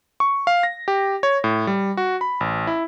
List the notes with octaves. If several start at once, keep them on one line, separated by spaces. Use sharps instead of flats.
C#6
F5
A#6
G4
C#5
A2
G3
F#4
B5
A1
E4